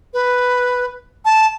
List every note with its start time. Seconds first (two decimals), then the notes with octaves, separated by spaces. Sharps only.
0.14 B4
1.25 A5